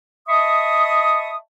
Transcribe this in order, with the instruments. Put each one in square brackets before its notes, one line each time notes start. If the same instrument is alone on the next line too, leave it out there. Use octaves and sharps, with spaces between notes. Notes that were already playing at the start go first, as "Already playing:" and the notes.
[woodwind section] D#5 E5 A5 B5 C#6 D#6